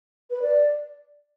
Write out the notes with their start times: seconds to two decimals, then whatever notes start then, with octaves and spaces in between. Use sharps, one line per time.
0.30 B4
0.42 D5